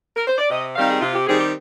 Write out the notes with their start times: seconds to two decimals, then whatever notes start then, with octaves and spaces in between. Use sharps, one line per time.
0.15 A#4
0.27 C5
0.38 D5
0.50 C3 D#5
0.75 D#3 G3 C4 D#4 F5
0.89 G#4
1.01 C3 F4
1.14 G4
1.26 D#3 G3 C4 D#4 G#4
1.39 G4